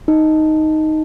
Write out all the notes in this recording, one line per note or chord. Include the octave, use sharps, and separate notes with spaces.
D#4